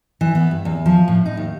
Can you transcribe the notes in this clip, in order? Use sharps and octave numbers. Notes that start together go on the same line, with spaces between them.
E3
B3
G2
E2
F3
A2
D#4
D#2